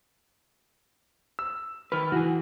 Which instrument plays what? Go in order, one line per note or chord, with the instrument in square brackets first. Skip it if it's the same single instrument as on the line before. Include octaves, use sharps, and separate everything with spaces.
[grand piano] E6
[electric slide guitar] D#3 B4 [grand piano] F6
[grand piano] E3 [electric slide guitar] F#4 G#4